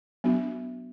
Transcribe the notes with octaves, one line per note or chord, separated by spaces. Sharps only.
F#3 B3 D4 F#4